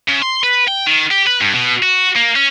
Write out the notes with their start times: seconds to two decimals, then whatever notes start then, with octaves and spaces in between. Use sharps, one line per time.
0.09 C#3
0.22 C6
0.43 B4
0.67 G5
0.86 D#3
1.11 G4
1.27 B4
1.41 G2
1.53 B2
1.82 F#4
2.16 A#3
2.35 C#4